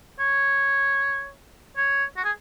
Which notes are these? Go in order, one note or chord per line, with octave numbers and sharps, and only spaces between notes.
C#5
C#5
F#4
G#4